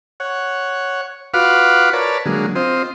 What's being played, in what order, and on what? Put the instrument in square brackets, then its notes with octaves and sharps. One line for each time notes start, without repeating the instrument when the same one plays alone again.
[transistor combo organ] C#5 F#5
F4 F#4 B4 F5 F#5 D6
A#4 B4 C#5 D5 A5
D3 F#3 G#3 A#3
C4 F4 C5 D#5